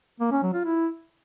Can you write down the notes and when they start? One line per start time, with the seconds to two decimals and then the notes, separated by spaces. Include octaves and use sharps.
0.20 A#3
0.31 C#4
0.42 F#3
0.54 F4
0.65 E4